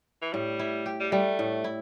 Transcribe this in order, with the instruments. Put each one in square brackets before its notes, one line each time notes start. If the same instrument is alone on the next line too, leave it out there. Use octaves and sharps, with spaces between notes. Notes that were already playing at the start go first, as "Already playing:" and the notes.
[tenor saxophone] E3
[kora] A2 [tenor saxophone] G3
[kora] E4
G4
[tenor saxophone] G3
[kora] G3 [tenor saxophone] A3
[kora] A2
E4